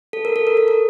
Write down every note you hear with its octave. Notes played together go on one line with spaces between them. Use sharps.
A4
A#4
A4
A#4
A4
A#4